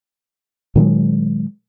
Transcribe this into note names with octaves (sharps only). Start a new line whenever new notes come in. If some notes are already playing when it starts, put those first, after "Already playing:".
A#2 D#3 F#3 G#3